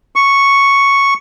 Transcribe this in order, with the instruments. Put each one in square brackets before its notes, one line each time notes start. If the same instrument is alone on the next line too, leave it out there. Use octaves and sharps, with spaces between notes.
[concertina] C#6